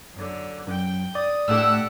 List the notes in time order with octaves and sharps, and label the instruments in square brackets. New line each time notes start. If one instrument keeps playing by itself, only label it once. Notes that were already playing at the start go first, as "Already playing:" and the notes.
[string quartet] F#2 D3
[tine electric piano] F#2 [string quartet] G5
[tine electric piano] D5 [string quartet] D#6
[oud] A2 A4 [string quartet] D4 G4 F#5 [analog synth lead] E6